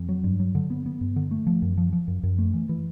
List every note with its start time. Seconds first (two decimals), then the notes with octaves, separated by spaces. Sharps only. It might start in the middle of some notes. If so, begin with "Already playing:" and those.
Already playing: F2
0.09 F#3
0.24 G2
0.40 F#3
0.55 D3
0.70 B3
0.86 B3
1.01 G2
1.16 D3
1.31 A3
1.47 F3
1.62 F#2
1.78 F3
1.93 F3
2.08 F#2
2.23 F#2
2.38 A3
2.54 E3
2.69 E3